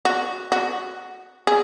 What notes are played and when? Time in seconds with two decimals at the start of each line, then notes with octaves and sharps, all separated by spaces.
0.05 F#4
0.52 F#4
1.47 G#4